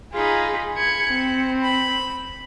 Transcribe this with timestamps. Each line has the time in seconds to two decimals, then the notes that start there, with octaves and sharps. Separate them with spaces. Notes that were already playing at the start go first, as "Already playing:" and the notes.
0.13 D#4 F4 G#4 B5
0.77 B5 G#6 C#7
1.12 C4
1.61 B5